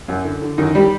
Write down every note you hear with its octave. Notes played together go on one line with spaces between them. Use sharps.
F#2
D3
D3
F#2 D#3 D#4
G3 G4